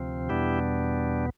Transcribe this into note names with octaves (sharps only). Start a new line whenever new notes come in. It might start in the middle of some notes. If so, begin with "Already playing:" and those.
Already playing: D2 C3 F3 C4
E2 B2 G3 B3 D4 E4 G4